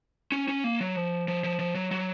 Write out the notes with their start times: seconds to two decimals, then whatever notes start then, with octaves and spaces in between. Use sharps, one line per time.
0.32 C#4
0.48 C#4
0.64 A#3
0.81 F#3
0.96 F3
1.28 F3
1.44 F3
1.59 F3
1.75 F#3
1.91 F#3